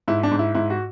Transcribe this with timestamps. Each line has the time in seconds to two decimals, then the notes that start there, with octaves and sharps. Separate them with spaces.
0.08 G#2 E4
0.23 D4
0.31 G#2
0.39 E4
0.55 G#2 E4
0.70 F#4